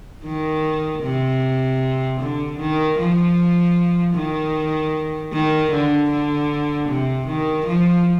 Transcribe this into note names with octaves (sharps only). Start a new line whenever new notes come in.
D#3
C3
D3
D#3
F3
D#3
D#3
D3
D3
C3
D#3
F3